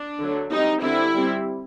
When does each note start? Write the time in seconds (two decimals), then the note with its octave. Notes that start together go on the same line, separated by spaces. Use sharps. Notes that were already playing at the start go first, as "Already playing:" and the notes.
Already playing: D4
0.20 D3 F#3 A3
0.51 G3 C4 D#4
0.82 D3 G3 C4 E4
1.14 G3 C4